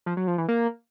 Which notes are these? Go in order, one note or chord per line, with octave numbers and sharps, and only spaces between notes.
F3
F#3
F3
E3
A#3